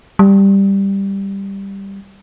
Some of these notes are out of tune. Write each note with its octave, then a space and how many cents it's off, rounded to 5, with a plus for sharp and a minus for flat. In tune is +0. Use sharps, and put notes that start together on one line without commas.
G3 +5